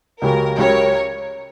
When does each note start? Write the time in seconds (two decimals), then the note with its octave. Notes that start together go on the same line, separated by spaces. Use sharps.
0.22 C#2 C#3 F#3 C#4 G4 A#4
0.58 C#2 C#3 F#3 C#4 G4 A#4 C#5